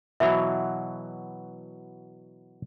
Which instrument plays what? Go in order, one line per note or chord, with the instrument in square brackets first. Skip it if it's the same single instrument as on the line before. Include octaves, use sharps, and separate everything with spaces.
[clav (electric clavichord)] B2 E3 F#3 [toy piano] E5 B5